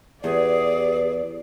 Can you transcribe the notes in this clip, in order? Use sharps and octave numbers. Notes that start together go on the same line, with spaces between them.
E2 G4 G#4 B4 D5